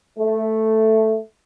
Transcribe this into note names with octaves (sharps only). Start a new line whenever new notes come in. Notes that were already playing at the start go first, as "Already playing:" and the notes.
A3